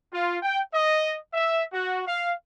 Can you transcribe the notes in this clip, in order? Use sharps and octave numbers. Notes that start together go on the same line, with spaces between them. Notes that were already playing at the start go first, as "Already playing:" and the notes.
F4
G5
D#5
E5
F#4
F5